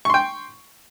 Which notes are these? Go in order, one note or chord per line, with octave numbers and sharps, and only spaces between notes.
G5 C6 C#6